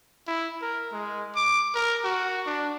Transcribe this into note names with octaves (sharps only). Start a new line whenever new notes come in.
E4
A#4
G#3
D6
A#4
F#4
D4